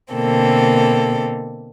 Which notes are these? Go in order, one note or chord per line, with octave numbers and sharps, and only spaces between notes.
B2 D3 A#3 C4 A4